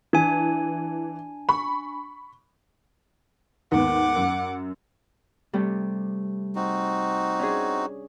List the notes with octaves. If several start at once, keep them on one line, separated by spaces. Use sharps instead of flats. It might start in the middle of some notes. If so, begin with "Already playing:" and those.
E3 D4 G#5
B5 C#6
D#2 G#2 B3 F#5 D6
F#2
C3 G3 A3
C4 D#4 F#4
C#4 D4 G#4